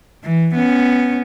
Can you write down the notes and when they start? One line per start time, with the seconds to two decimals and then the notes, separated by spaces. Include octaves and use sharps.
0.24 E3
0.55 B3 C#4